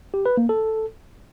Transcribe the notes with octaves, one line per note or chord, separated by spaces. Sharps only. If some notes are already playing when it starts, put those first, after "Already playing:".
G4
B4
A#3
A4